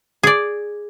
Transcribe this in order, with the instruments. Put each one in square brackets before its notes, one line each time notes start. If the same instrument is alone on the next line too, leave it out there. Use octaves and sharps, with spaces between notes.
[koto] G#4 D5